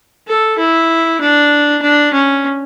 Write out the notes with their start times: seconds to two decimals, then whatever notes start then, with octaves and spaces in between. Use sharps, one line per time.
0.28 A4
0.59 E4
1.21 D4
1.82 D4
2.14 C#4